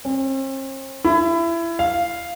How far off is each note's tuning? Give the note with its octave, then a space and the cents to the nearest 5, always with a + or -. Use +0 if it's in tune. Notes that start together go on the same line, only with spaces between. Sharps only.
C4 +45
E4 +25
F5 -5